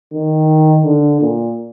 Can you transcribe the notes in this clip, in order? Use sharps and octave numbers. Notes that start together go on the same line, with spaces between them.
D#3
D3
A#2